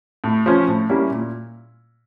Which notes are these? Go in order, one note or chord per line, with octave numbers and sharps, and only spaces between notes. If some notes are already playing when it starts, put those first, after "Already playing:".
A2
F3 C#4
A2
G3 A#3 C#4 E4
A#2